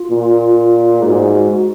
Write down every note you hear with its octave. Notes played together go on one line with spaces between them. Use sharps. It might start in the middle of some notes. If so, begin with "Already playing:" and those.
Already playing: F4
A#2
G#4
G#2 F#4